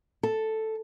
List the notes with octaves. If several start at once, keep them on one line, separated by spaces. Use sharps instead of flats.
A4